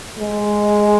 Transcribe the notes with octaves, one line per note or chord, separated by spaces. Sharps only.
G#3